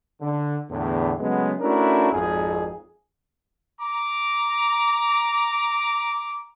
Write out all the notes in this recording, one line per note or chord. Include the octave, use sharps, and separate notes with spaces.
D3
E2 A2 D3
C#3 F#3 G#3 A3 B3
A3 C#4 D4 E4 F#4 A#4
G#1 F2 G#4
A#5 D6